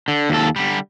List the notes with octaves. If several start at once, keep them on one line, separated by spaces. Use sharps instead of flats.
D3
D#2 A4
D3 G3